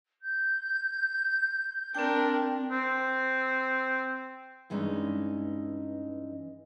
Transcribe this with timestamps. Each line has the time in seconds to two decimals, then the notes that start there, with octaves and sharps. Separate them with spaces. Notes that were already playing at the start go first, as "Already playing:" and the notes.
0.20 G6
1.95 C4 D4 A#4 G5
2.71 C4
4.70 G2 E3 G#3 C#4 D#4